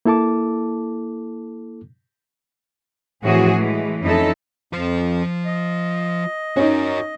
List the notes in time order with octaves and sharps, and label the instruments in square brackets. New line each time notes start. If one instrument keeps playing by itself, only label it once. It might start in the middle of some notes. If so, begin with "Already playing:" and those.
[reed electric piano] A#3 E4 A4 A5 D6
[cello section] A2 E3 F3 C4 F#4 G#4
E3 G#3 A3
F2 C#4 D#4 E4 A4
[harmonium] F2 [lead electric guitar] F3 C5
[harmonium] D#5
[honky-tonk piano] C#4 D#4 [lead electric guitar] F#4 A#4